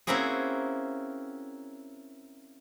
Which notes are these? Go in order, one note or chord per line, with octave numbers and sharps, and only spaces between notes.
A#3 C4 C#4 E4 F#4 G#4